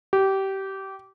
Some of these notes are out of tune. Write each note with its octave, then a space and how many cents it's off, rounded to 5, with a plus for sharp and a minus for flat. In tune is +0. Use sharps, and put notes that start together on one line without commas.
G4 -20